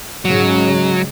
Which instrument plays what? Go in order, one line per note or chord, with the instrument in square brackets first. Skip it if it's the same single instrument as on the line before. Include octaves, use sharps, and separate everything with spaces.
[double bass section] G#2 C#3 G#3 [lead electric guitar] F#3